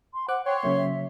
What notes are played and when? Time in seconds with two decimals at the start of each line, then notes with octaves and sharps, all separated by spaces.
0.14 C6
0.28 C5 F#5 D6 F#6
0.46 C#5 G5 C6
0.63 C#3 F#3 A#3 E5
0.76 E5